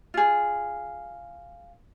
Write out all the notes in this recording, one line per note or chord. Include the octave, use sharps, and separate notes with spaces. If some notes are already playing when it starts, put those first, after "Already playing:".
F4 G#4